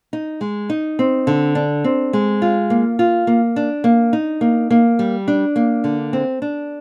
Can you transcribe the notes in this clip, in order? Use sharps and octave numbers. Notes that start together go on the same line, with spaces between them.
D#4
G#3
D#4
C4
D3
D4
C4
G#3
F4
A#3
F4
A#3
D4
A#3
D#4
A#3
A#3
G3
D4
A#3
D3
C4
D4